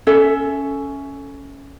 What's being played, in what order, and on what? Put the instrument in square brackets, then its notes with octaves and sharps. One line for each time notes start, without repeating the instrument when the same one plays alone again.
[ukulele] C#4 A4 E5